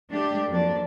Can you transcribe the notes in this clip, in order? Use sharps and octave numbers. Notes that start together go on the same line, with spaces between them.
A3 D4 G4
F2 F#3 A#3 D4